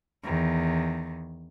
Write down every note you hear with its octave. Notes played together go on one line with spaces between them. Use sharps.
E2 D#3